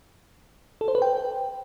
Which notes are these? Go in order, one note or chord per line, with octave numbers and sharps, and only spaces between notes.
A4
C5
B4
G5